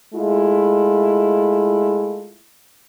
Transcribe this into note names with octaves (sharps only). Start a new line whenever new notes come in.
G#3 A3 E4 F4